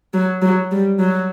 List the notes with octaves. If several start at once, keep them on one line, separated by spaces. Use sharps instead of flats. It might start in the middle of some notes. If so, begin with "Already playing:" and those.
F#3
F#3
G3
F#3